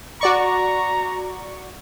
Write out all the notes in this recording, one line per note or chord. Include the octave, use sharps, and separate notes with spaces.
F#4 D5 A#5 C#6